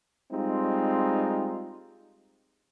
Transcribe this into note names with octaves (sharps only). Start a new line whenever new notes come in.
G3 G#3 C4 D#4 F4